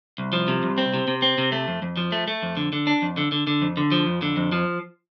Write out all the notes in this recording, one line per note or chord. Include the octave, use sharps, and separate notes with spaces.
C2
F3
C3
C2
C4
C3
C3
C4
C3
A3
F2
F2
F3
A3
A3
F2
D3
D3
D4
F2
D3
D3
D3
F2
D3
F3
F2
D3
F2
F3